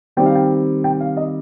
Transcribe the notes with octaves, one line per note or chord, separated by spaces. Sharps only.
D#3 G3 C4 G5
F5
G5
G5
F5
D#5